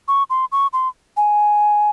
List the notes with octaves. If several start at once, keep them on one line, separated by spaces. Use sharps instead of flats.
C#6
C6
C#6
C6
G#5